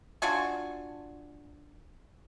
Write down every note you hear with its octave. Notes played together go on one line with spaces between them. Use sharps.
D4 F4 F#4 G#5